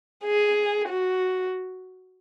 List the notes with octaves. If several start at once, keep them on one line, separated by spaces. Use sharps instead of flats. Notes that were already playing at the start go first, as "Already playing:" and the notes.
G#4
F#4